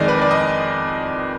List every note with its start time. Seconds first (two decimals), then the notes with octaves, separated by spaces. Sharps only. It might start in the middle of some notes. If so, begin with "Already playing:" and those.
Already playing: F2 D#3 G#3 D5 D#5
0.08 B4
0.21 D5
0.31 D#5